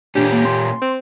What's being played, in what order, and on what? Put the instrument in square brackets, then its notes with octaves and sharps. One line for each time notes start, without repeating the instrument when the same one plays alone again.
[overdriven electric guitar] A#2 C#4 [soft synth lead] D4 [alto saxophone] G4
[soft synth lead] A#3
C6
[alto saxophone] C4